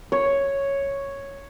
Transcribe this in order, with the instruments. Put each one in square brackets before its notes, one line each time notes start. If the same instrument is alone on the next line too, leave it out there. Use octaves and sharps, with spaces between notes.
[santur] C#5